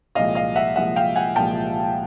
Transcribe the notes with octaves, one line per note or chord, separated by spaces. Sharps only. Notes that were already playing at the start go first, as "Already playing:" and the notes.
C2 A#2 F3 G#3 D#5 F5
D#5 F5
E5 F#5
C2 A#2 F3 G#3 E5 F#5
F5 G5
F#5 G#5
C2 A#2 F3 G#3 G5 A5